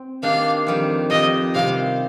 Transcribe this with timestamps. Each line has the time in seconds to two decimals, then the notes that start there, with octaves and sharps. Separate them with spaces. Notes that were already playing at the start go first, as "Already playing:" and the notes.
Already playing: C4
0.23 D#3 A#3 D4 G4 F5
0.67 F2 D#3 G3
1.10 F2 D#3 G3 D#5
1.54 C3 D#3 G3 F5